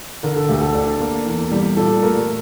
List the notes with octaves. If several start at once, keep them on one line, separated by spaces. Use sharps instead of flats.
D3 A#4
A4
D2 G4
A4
D4
A#3
E2
G3
A#2 A4
A3 A#4